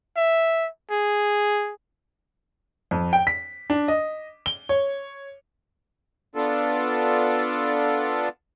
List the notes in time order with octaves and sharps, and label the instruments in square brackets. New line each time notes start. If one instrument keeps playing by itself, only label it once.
[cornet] E5
G#4
[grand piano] F2
G5
B6
D4
D#5
G7
C#5
[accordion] B3 D4 F4 A4